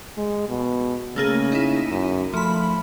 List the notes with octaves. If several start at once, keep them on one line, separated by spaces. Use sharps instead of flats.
G#3
B2
C#3 A3 A#3 G#4
D#4 E4
F#2
F3 A3 B5